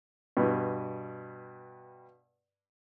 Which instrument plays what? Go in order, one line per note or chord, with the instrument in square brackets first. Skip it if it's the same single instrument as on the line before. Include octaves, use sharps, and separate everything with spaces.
[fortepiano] G2 B2